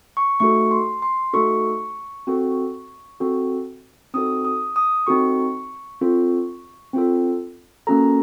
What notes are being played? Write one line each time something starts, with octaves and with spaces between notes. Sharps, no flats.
C#6
A3 D#4 F#4 A4 C#6
C6
C6
A3 D#4 F#4 A4 C#6
C4 F#4 A4
C4 F#4 A4
C4 D#4 F#4 A4 D#6
D#6
D#6
C4 D#4 F#4 A4 C#6
C4 F4 A4
C4 F4 A4
A#3 C#4 F#4 A4 A#5